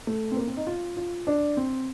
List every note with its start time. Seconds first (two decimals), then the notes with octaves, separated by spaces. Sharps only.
0.07 A3
0.32 C4
0.37 A#3
0.47 C4
0.57 D#4
0.67 F4
0.97 F4
1.27 D4
1.57 C4